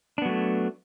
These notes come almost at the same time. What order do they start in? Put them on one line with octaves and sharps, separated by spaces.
D4 B3 F#3 A3